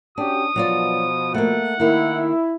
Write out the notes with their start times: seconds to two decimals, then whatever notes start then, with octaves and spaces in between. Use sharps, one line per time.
0.18 C#4 D4 F#4 G4 D#6
0.56 B2 F3 F#3 F4 D5
1.34 A3 A#3 F#5
1.80 D#3 A#3 E4